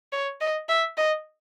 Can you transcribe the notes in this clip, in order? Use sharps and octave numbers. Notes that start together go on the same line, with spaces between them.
C#5
D#5
E5
D#5